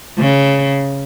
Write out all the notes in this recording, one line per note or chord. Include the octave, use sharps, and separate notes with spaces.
C#3